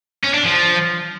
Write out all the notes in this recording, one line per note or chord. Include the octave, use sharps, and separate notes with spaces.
C#4
D4
F3